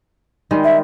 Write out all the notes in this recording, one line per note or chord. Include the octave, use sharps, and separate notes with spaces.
D#3 G3 G#3
E5